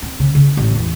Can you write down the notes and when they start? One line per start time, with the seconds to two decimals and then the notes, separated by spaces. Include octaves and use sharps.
0.02 C4
0.19 C#3
0.35 C#3
0.57 A1
0.75 E2